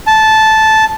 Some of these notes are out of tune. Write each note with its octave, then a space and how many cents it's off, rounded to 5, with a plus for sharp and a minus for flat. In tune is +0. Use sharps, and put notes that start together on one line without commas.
A5 -10